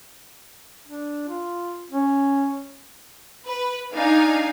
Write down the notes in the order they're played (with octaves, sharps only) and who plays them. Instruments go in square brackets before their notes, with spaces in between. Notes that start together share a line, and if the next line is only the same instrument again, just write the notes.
[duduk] D4
F4
C#4
[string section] B4
D4 D#4 F5 G#5